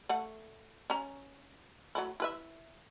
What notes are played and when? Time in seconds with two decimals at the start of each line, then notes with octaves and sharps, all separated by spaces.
0.09 A3 F#5
0.90 C#4 A#5
1.95 F#3 A3 E4
2.20 E4 B4 E5